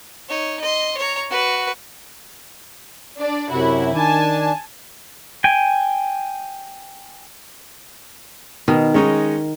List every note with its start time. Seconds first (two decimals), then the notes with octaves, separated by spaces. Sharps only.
0.29 D#4 C#5
0.61 D#5 C6
0.97 C#5 A#5
1.30 F#4 B4
3.17 D4 D5
3.51 F#2 C3 E4 F#4
3.94 D#3 D4 G#5 A5
5.44 G5 G#5
8.68 B2 D#3
8.94 G#3 C#4 D#4